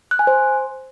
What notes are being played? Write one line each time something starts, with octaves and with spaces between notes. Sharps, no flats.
F#6
G#5
C5